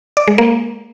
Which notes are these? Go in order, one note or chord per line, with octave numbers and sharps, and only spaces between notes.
D5
G#3
A#3